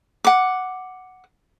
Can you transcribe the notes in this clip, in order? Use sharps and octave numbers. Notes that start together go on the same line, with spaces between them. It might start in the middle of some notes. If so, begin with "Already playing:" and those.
F#5 D6